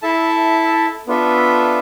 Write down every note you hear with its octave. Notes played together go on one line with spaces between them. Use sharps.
E4 A4 E5 A5
B3 D4 F4 A4 E5